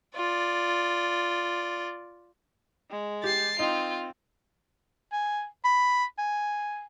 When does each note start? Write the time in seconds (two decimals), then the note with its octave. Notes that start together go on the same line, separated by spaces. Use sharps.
0.15 F4 D5
2.90 G#3
3.24 G4 A6 C7
3.59 C4 D#4 F4
5.12 G#5
5.64 B5
6.18 G#5